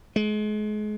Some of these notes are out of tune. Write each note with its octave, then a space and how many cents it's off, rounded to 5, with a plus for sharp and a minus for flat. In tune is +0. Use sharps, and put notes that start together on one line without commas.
G#3 +35